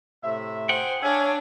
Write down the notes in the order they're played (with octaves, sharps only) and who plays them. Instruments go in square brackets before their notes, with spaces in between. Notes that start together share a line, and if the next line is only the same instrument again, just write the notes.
[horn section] A2 C3 E5
[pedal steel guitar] G#4 F#5 G5 [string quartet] C5
[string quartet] D4 [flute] C#5 [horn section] E5 F5 G#5